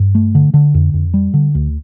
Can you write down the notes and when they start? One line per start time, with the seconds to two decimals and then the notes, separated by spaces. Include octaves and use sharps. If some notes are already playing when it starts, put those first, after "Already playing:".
Already playing: G2
0.15 A3
0.35 D3
0.54 D3
0.74 F2
0.94 F2
1.14 G3
1.34 D3
1.55 D2